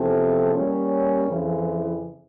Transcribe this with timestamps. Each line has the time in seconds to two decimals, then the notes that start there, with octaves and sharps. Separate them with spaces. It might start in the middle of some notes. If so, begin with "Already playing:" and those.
Already playing: E2 C3 F3 A3 C4
0.53 G3 A#3 C#4
1.28 F2 C#3 E3